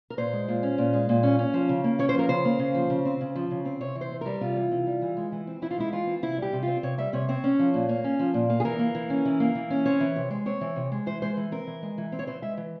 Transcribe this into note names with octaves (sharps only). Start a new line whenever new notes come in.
A#4
A#2 C5
G#3
A#2
C#4
A#2
G#3
A#2
C#4
C#4
F3
C#3
A#3
C#4 C#5
C5
F3 A#4
C#3 C5
A#3
C#3
F3
C#3
C4
C#3
F3
C#3
C4
C3 C#5
E3
C5
C3
G3 A#4
C3 F4
E3
C3
G3
E3
G#3
E3
C4
E3 E4
F4
G#3 E4
E3 F4
C4
C3 E4
G3 G4
C3
C4 F4
C3 C#5
G3 E5
C3 C#5
C4 C#5
C#4
F3
A#2
A#3
C#4
F3
A#2
A#3
G#4
E3 A#4
A#3
E3
C#4
E3
A#3
E3
C#4
C4 C#5
E3
C3
G#3
C4 C#5
E3
C3
G#3
E3 C5
G#3 C5
E3
C4 A#4
E3
G#3
E3
C4
C#5
E3 C5
G#3 E5
E3